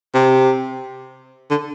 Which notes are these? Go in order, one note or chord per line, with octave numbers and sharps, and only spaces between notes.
C3
D3